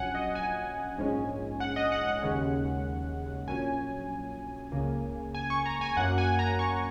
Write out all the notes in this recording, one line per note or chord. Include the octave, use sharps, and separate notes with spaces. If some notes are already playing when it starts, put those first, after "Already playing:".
Already playing: A#1 A#2 F#3 C#4 F#5 G#5
D#5
G#5
A#1 G#2 G#3 C#4
F#5
D#5
F#5
F#5
D#2 C#3 G#3 C#4
A#1 A#2 F#3 C#4 G#5
C#2 C#3 A#3
G#5
C#6
A#5
G#5
F#2 F#3 A#3 F#5
G#5
A#5
C#6